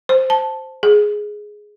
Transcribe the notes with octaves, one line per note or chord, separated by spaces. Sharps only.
C5
A5
G#4